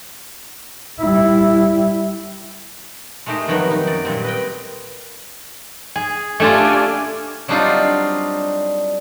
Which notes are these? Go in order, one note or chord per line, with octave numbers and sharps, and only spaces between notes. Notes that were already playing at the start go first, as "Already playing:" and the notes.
G3 E4
G#3 A3 D#4 G4 A#4 C5
F2 D#3 F#3 G3 B3
D#4 G4
F#2 D5
A#2 G3 C4
B4 D#5 G5
G#4
A3 C#4 D4 F4 G4 G#5
F#3 G3 C4 D4 D#4 F4